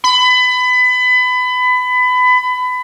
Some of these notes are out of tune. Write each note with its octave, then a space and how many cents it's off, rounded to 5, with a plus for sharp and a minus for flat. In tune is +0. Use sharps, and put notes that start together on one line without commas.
B5 +25